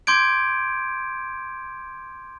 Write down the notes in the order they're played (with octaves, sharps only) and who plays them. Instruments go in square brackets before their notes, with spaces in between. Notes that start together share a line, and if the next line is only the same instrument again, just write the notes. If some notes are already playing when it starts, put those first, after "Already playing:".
[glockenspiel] C6 D6 G6 G#6 D7